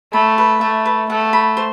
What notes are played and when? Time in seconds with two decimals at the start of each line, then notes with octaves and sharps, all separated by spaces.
0.13 A3 B5
0.38 B4
0.61 A3 E5
0.86 B4
1.10 A3 F#5
1.33 B5
1.57 C5